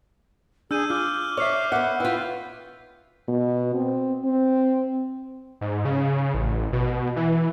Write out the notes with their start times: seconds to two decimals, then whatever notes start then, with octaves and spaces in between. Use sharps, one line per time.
0.71 D4 G#4 E6 G6 D#7
0.90 F4 D6 F6 G6
1.37 C#5 D5 E5 C#6 F6 C7
1.72 B3 E5 F#5
2.00 E4 F4 B4 G5
3.28 B2
3.75 C4
4.25 C4
5.61 G#2
5.85 C#3
6.34 A1
6.73 B2
7.16 E3